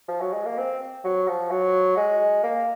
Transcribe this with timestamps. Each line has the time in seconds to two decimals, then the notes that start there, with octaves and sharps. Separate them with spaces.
0.08 F3
0.21 F#3
0.33 G#3
0.45 A#3
0.58 C4
1.04 F#3
1.28 F3
1.50 F#3
1.97 G#3
2.43 A#3